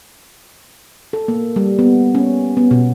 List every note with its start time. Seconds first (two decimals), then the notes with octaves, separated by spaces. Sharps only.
1.13 A4
1.28 A#3
1.56 G3
1.79 B3
2.15 C#4
2.57 B3
2.71 B2